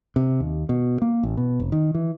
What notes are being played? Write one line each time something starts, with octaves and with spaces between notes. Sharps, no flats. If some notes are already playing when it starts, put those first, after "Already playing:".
C3
D#2
B2
A#3
A1
B2
F1
D#3
E3